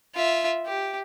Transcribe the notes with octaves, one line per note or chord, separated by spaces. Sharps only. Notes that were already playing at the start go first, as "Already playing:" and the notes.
F4 E5
G4